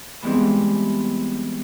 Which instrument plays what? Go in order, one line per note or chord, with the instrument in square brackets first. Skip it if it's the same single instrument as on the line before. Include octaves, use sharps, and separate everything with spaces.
[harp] E3 G3 G#3 B3 C4